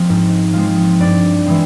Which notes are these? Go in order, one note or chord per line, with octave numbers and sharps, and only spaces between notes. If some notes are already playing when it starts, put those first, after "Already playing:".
Already playing: F3 G#3 C4 D#5
G#2
F3 G#3 C4
G2 D5
E3 G#3 C4